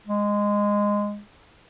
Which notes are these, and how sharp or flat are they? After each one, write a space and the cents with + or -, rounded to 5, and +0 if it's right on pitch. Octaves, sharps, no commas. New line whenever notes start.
G#3 -15